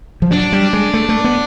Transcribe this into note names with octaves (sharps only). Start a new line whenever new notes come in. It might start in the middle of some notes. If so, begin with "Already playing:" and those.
F3
F#3 D4
G3
G#3
A3
A3
B3